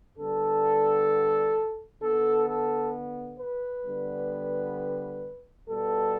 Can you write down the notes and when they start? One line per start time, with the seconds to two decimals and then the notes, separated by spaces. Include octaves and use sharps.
0.18 D3 G3 B3 A4
2.01 D3 B3 A4
2.47 A4
3.39 B4
3.85 D3 G3 B3
5.68 B2 G3 B3 A4